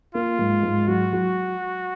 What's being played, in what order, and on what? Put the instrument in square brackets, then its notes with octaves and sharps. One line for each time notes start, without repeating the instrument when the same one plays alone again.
[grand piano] A#3 [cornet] F4
[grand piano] G#2
G#2
[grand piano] F#3 [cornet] F#4
[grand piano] F#3